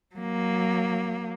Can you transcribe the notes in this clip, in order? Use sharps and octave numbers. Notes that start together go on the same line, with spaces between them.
F#3 A#3